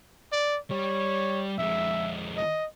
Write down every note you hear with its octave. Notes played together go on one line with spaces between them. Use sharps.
D5
G3 C#5
F2 G#3 E5
D#5